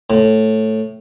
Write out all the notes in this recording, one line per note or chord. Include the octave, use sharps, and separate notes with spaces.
A2